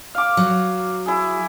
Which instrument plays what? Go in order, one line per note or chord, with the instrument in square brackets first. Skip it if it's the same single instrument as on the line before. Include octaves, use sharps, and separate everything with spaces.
[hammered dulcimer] F5 D6
[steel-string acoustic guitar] F#3
[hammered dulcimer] E4 G#4